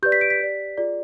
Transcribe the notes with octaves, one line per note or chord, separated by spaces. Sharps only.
G4 B4 D5 G6
B6
D7
B6
G4 D5
F4 G#4 D5